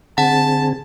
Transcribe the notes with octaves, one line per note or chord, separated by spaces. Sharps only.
D3 C4 G#4 F#5 A5